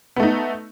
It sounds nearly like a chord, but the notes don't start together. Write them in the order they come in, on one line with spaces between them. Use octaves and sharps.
B3 A3 D#4